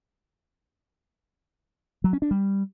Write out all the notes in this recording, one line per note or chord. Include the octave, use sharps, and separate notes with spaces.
F#3
C#4
D4
G3